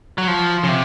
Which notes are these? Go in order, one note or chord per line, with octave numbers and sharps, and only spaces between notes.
F#3
F3
C#3
C3